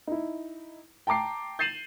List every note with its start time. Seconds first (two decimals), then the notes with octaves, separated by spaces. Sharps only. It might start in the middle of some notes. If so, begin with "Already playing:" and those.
0.07 D#4 E4
1.07 G5 A5 A#5 D6 C7
1.59 G6 A6 C7 D#7 E7 F#7